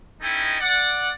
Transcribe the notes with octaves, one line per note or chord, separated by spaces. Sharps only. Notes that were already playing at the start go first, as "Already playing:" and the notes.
C#4 D#4 E4 A4 D#5 G5
D5 F#5